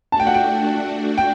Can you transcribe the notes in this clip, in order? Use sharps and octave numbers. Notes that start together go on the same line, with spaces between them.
A3 D4 F#4 A5
G5
F#5
G5
G5